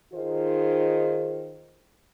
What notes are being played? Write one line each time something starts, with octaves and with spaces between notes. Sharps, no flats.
D#3 D#4 F4 G#4 C5